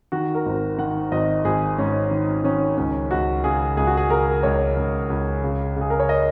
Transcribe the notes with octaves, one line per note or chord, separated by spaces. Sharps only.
D#3 F#4
A#4
G#1
D#3 F#5
G#1 D#5
G#1 G#4
G#2 C#4
D#3
D#3 C#4
C#2 C#4
C#2 F#4
C#3 G#4
C#2 G#4
F#4
G#4
C#3 A#4
C#2 C#5
C#2
C#2
C#3
C#3 G#4
A#4
C#5
D#5